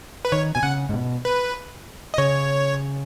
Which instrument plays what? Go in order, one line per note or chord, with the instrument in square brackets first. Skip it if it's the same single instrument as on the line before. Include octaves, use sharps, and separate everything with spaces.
[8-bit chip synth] B4
[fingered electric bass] D#3 [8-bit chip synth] C#5
[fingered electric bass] B2 [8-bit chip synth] G#5
[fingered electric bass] C#3 [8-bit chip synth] F#5
[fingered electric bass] G#2
B2
[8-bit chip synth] B4
D#5
[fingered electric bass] C#3 [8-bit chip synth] C#5